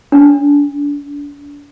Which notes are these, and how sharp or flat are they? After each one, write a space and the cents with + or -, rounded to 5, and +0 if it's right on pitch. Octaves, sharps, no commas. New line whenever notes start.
D4 -35